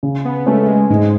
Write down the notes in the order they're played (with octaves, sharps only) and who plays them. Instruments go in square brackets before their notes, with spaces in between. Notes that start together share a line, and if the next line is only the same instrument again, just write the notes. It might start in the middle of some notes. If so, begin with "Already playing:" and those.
[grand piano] C#3
[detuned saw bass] B3
[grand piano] G#3 C#4 G#4 B4 [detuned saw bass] A3
[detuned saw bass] G#3
[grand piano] G#2 [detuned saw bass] G#3